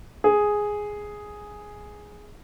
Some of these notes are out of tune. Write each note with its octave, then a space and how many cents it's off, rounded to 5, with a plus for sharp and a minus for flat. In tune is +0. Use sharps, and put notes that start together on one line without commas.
G#4 +0